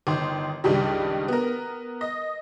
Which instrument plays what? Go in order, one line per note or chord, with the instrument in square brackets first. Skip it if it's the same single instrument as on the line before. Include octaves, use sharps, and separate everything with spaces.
[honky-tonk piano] G1 D#3 C6
C#2 G2 D#3 G3
B3 A#4
D#5